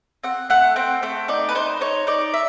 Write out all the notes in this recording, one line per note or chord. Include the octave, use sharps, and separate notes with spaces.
C4 F#5
A3 F#5
C4 G5
A3 G5
D#4 D5
B4
D#4 C5
D#4 C#5
D#4 D5
E5